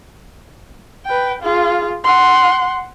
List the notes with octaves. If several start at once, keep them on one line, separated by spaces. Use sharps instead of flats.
B4 G5
F4 G#4
F#5 C6